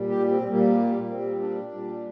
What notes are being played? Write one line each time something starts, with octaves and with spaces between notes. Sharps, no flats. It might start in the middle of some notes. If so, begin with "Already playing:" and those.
Already playing: A#2 G3
G4
C4
A#2 G3 A#3
A#3
A#2 G3 C4
D4
A#2 G3